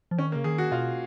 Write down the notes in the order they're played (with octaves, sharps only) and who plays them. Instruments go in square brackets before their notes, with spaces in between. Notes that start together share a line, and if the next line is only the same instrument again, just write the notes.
[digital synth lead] F3
[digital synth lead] D#3 [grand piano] C#4
[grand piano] A#3
[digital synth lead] C#3
[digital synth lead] D#3 [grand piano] G#4
[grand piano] F#4
[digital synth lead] B2 [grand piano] F4